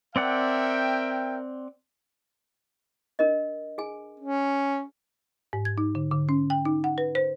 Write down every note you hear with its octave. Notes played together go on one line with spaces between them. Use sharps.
C4 A#4 D5 E5 F#5 G5
D4 A#4 D#5
G#4 G#5
C#4
G#2
G#6
D#4
D3
D3
C#4
G5
D#4
F#5
B4
C5